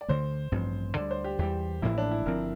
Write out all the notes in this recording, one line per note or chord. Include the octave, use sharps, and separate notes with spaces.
D5
D2 D3 A3 C5
A1 G2 F3 C4
D2 D3 G3 D5
C5
G4
E2 E3 G3 G4
A1 A2 F3 A#3 E4
D4
E4
G1 G2 F3 C4 A#4